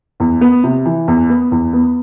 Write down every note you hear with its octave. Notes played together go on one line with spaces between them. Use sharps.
E2
B3
C3
E3
E2
B3
E2
B3